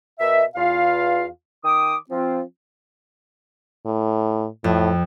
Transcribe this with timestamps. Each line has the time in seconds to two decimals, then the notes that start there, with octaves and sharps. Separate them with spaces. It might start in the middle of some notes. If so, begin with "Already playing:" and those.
0.20 B2 A#4 D#5 E5
0.56 E2 F4 F5
1.64 D#3 G5 D6 D#6
2.10 F3 C4 F4
3.86 A2
4.64 F2 A2